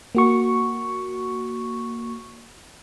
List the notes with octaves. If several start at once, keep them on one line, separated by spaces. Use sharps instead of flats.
A#3 F#4 C#6